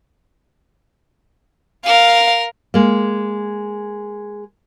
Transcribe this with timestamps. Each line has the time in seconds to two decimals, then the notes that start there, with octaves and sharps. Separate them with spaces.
1.86 A#4 F5
2.74 G#3 A#3